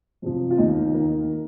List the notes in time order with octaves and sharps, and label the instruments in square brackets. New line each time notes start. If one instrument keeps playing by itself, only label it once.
[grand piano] F2 C3 F3
F4
D#2 D#4
D#3 A#3